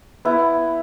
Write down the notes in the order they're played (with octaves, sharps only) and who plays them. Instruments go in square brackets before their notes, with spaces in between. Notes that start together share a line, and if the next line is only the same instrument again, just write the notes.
[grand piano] B3 [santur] E4